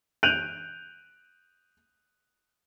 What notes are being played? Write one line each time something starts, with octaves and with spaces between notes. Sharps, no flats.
F#6 G6 D7 D#7 F7 F#7